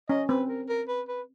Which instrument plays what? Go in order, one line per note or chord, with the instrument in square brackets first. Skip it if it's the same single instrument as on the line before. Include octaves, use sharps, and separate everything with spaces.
[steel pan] C#4 [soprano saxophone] D#5
[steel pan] C4 [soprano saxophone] B4
[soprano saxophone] A#4
A#4
B4
B4